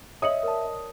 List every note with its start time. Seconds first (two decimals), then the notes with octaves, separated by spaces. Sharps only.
0.22 C#5 D#5 E5 D#6 C#7 F#7
0.43 A#4 D5 A5